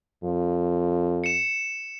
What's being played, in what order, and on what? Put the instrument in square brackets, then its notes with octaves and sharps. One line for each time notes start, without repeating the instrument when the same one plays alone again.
[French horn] F2
[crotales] C#7 E7